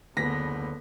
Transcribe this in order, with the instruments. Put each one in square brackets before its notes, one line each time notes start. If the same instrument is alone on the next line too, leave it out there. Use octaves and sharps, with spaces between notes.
[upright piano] F#1 B4 B6 [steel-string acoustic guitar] D2 [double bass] D3 B3 [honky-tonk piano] A#6